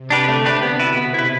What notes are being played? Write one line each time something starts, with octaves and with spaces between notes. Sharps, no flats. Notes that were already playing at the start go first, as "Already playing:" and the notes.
Already playing: C3
D4 G4 B4
D3 A3
D4 G4 B4
B2 B3
E4 B4
C3 B3
E4 B4